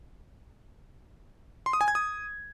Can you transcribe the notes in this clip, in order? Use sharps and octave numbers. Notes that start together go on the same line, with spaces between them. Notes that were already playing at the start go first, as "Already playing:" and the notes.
C6
D#6
G#5
G#6
D#6